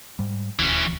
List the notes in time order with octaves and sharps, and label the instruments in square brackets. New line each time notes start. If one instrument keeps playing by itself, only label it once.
[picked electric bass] G#2 G3
[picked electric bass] D#1 G#1 D2 [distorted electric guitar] E3 C#4